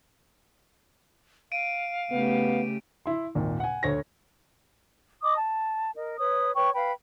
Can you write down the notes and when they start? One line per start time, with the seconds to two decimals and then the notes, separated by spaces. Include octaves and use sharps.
1.52 F5 D7 D#7
2.12 C#3 A3 B3 G4
3.06 E4 C6
3.35 G#1 D#2 A#2
3.60 F#5 G#5
3.83 D2 C#5 A#6
5.23 D#5 D6 D#6
5.36 A5
5.95 A#4 D#5
6.19 B4 C#5 D#6
6.55 B4 C#5 G5 C#6
6.74 B4 F5 G5 B5